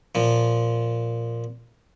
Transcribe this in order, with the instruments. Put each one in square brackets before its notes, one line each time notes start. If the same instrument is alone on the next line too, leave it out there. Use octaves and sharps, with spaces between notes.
[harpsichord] A#2 F3